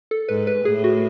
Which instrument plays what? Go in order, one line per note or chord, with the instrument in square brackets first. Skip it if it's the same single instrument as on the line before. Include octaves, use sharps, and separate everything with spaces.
[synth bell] A4
[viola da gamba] G#2 [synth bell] B4
[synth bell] B4
[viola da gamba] A2 [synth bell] G#4
[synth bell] F#4